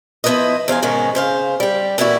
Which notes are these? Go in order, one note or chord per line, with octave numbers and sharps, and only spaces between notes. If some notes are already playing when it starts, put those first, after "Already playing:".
F3 B3 E4 B4 C5 D#5
E2 C5 F5 G#5
G#2 B2 D#3 G#3 C#4
C#3 C5 F5
G3 G4
A#2 E3 G3 E4 F#4